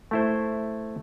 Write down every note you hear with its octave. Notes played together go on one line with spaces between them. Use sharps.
A3 E4 C5